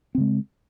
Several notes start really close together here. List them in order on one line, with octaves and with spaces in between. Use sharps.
C4 C#3 G#3